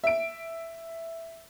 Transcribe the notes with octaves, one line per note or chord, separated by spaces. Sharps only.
E5 D7